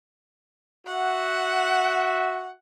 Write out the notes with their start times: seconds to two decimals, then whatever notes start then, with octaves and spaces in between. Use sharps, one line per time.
0.87 F#4 E5 F#5